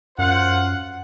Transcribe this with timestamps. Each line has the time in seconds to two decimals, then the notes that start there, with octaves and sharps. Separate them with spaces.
0.19 F#2 F4 C5 F#5